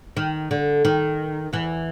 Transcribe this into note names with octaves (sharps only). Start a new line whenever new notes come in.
D#3
D3
D#3
E2 E3